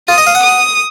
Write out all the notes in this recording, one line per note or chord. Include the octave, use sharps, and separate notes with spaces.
F4 D#6
D#5
F5
F#5
D#6